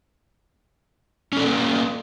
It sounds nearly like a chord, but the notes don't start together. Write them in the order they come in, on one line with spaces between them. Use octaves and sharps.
C#4 A4 D5 A#3